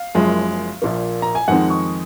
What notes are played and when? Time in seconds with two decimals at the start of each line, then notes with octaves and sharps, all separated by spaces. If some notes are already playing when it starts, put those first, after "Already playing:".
Already playing: F5
0.15 F#1 F#2 F3 G#3
0.82 A#1 A#2 F3 A#3
1.22 A#5
1.35 G#5
1.48 F2 D#3 G#3 C4 D#4 F#5
1.70 C#6